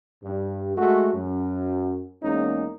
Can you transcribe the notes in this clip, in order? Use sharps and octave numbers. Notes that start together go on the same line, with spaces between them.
G2
G#3 A3 F#4
F#2
E2 G#3 A#3 C#4 D#4